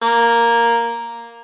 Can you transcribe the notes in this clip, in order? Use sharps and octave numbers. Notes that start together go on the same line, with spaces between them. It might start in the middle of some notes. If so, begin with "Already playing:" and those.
A#3